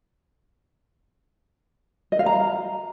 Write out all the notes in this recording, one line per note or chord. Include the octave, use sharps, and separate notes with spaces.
D#5
F5
A#5